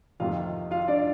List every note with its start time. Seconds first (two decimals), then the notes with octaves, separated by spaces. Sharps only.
0.20 F2 C3 D#3 A#3 F4 F5
0.71 F4 F5
0.88 D4 D5